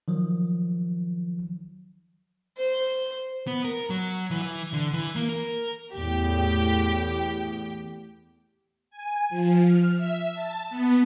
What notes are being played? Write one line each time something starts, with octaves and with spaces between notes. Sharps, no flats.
D#3 F3 F#3
C5
B3
A#4
F#3
E3
E3
D3
E3
A#3
A#4
E2 A2 G4 G5
G#5
F3
F6
E5
A5
B3